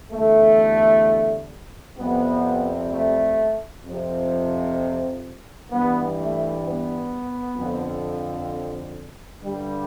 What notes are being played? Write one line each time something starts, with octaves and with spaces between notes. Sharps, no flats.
E2 D3 G3 A3
F2 C3 G3 B3
A3
F2 C3 F3
G2 E3 G3 B3
A3
B3
F2 D3 F3
G2 D3 G3